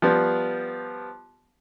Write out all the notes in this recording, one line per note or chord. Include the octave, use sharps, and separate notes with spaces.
F3 G3 B3